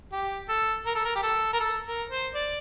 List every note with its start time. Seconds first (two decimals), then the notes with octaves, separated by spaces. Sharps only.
0.12 G4
0.49 A4
0.86 A#4
0.95 A4
1.05 A#4
1.16 G4
1.23 A4
1.53 A#4
1.60 A4
1.86 A#4
2.10 C5
2.35 D5